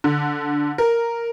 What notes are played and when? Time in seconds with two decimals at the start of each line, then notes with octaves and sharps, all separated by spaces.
0.04 D3
0.78 A#4